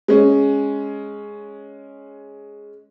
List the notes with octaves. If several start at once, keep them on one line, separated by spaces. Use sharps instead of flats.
G#3 C#4